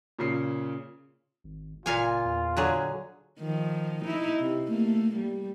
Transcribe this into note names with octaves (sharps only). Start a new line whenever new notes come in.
A#2 C#3 C7
G#1
F#1 A#2 F4 F5 G#5
E2
D3 F#3 G#4
D#3 F3
D#4 E4
C3
A3 A#3
G3